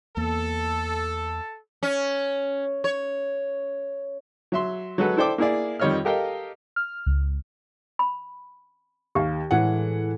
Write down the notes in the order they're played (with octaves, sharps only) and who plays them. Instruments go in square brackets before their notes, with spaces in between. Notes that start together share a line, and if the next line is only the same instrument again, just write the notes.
[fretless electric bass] E2 A#3 [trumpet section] A4
[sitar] C#4
C#5
[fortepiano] F#3 E5 C6
F#3 G#3 F#4 A4 B4
E4 A4 C5 D5 G5 D6
A#3 E4 G#4 D5
F2 D#3 G3 C#5 D#5 F6
G4 A4 A#4 D#5 F5 G5
[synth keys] F6
C#2
[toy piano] B5
[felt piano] D#2 F5 [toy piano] G4
[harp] A2 G#3 [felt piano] E3 F#5